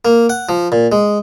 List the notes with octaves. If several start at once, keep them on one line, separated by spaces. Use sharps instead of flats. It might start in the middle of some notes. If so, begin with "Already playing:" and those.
A#3
F#5
F3
A#2
G#3